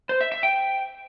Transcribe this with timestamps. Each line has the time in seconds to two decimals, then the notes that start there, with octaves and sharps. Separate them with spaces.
0.09 C5
0.21 E5
0.32 E5
0.43 G5